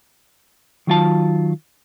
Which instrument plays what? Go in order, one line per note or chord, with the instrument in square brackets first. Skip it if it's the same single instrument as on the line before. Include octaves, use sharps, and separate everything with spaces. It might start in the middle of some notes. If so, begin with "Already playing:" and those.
[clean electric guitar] D#3 F#3 F4 A5